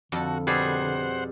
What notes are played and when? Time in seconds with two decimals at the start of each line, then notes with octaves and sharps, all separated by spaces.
0.12 F2 D3 F#4 A4
0.47 B2 G3 G#4 C5 F#5